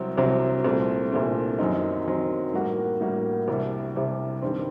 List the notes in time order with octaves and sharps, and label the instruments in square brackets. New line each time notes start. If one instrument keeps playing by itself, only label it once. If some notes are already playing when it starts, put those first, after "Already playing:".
Already playing: [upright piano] C2 C3 F#3 C4
C2 C3 F#3 C4
C2 A#2 A3 C4
C2 A#2 A3 C4
F#2 D#3 F#3 C4 D#4
F#2 D#3 F#3 C4 D#4
A2 G3 A#3 F#4
A2 G3 A#3 F#4
C2 C3 G3
C2 C3 G3
G2 D#3 G3 C4